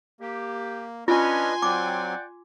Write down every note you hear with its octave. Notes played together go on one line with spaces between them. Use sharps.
A#3 G4
C#4 D4 F4 B4 D#5 G#5 C6
F#3 C4 D5 F#5 G5 D6